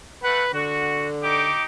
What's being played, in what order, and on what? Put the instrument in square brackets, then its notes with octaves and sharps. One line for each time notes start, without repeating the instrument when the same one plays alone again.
[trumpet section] A3 F#5 [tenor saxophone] B4
[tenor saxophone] D3 [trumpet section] F#4
[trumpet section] D#4 G4 D6